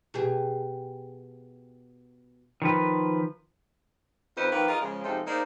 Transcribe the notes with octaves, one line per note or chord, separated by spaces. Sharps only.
B2 G4 G#4
D#3 F3 B4
F2 C4 D#4 B4 C5
D#3 F3 A#3 B4
F4 G#4 A#4 D#5
C#3 F3 G#3
C3 F3 G#3 D#4 A4
A#3 D#4 G#4 C5 D5